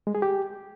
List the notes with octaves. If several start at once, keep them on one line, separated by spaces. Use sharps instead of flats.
G#3
G#4
G4